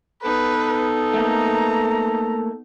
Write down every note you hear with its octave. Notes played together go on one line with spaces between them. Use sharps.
B3 D#4 A4 B4
A3 A#3 A#5